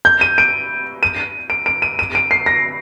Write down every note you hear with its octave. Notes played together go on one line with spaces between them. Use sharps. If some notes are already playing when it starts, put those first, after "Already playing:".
G6
D#7
D7
D#7
D7
D7
D#7
D#7
D7
C7
A#6